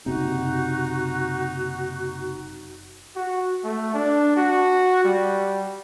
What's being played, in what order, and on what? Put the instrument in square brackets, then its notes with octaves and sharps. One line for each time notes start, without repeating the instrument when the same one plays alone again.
[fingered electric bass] F#1 C3 [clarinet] D#4 [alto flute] F#4
[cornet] F#4
A3
D4
F#4
G3